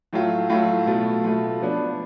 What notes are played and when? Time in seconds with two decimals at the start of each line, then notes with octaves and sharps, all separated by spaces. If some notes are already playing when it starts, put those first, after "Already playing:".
0.13 A2 F#3 A3 F4
0.49 A2 F#3 A3 F4
0.87 B2 A3 F4
1.24 B2 A3 F4
1.61 F3 B3 D4